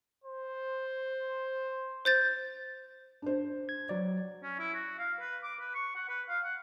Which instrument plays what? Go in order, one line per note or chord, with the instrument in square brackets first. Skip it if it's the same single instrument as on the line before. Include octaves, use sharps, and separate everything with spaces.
[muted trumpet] C5
[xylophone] C5 G6 A6
[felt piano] D4 C5
[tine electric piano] G#6
F#3 D5
[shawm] C#4
E4
F#4
F5
B4
D6
B4
C#6
F#5
B4
F5
F#5